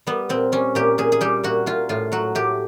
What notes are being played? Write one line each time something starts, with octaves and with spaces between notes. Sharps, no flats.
G3 B3
A#2 C4
G3 C#4
A#2 G4
A#2 G#4
G#4
G3 G4
A#2 F#4
A#2 F4
A2 F4
F#3 F#4
A2 G4